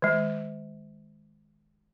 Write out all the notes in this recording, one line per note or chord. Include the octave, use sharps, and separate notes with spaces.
D#3 G#3